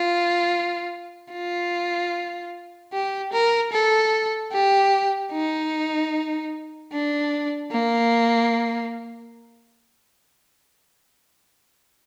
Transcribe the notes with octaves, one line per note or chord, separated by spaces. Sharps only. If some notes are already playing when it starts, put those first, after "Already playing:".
Already playing: F4
F4
G4
A#4
A4
G4
D#4
D4
A#3